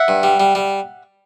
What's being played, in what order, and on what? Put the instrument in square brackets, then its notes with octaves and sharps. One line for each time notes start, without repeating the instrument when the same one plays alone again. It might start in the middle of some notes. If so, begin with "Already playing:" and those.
Already playing: [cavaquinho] E5 F#5
[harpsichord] G2
G3
G3
G3